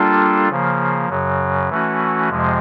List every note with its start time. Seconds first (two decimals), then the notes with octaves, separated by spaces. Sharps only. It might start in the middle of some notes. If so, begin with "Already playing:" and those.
Already playing: G3 A#3 D4 F4 A4
0.49 C#3 F3 A#3
1.09 F#2 C#3 F#3
1.69 E3 A3 C#4 F#4
2.29 F2 C3 F3 G#3